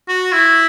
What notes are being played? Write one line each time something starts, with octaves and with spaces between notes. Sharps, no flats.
F#4
E4